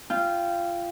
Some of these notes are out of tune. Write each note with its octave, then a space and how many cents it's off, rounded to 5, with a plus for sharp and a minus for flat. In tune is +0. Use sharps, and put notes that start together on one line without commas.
F4 -20 G5 +0